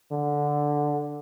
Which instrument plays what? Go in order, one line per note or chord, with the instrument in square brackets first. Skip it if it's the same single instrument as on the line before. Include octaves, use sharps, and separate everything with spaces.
[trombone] D3